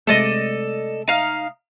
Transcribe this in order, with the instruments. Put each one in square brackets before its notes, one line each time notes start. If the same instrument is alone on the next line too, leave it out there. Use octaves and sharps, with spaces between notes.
[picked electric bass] C3 G#3 A3 [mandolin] A4 D5 D#5
[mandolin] D#4 F5